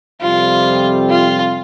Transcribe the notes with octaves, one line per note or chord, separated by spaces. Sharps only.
F2 C3 G3 C4 F4
F4